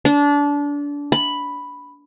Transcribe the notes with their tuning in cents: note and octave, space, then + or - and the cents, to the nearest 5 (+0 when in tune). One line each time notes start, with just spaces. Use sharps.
D4 -25
B5 +0